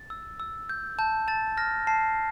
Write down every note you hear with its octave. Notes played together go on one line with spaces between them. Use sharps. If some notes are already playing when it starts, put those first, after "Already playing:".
Already playing: A6
E6
E6
G6
A5 G6
A5 A6
F6 A#6
A5 C7